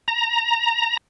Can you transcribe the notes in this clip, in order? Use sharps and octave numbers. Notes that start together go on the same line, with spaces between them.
A#5